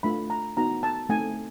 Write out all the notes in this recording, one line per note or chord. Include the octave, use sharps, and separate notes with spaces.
A3 D4 F4 B5
A#5
B3 D#4 F#4 A#5
A5
A3 C4 D#4 G#5